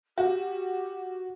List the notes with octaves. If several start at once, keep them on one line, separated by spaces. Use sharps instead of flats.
F#4 G4